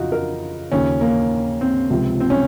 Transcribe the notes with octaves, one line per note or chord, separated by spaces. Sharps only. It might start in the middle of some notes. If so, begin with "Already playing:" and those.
Already playing: F2 C#3 F#3 D#4 F4 F#4
A#4
D#2 C#3 F3 C#4
A#3
C4
C#2 C3 F3
C4
C#4